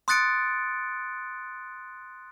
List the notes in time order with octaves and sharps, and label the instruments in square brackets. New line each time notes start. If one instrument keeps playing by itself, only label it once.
[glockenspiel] C6 D#6 F#6 A6 C#7 D7